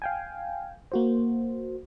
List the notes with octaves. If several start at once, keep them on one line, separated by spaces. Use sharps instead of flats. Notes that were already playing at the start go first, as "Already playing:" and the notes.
F5 G5 G#5
A#3 F#4 C5